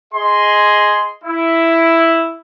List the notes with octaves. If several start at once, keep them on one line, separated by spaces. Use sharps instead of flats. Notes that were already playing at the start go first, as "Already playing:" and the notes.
G#4 D#5 C6
E4